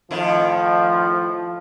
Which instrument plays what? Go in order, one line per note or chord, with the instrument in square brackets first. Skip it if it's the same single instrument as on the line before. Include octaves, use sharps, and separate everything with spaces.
[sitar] F2 D#3 E4 [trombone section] A2 F3